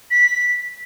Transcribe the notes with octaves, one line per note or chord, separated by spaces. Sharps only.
B6